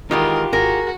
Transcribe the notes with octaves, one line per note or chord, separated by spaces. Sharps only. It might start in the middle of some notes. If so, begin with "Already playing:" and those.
D#3 E3 G#3 F4 G4 A#4
G#1 F#4 G#4 A#4